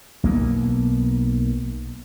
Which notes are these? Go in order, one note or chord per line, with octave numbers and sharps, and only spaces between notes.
B1 A#3 B3